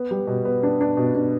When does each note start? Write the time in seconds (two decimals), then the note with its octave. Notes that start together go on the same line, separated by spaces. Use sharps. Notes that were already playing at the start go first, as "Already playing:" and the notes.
Already playing: B3
0.11 G3
0.27 B2
0.45 B3
0.63 D4
0.81 D4
0.97 B2
1.15 D4